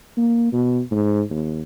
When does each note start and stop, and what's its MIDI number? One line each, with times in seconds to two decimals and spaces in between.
0.17 0.49 58
0.53 0.81 47
0.91 1.21 44
1.30 1.61 39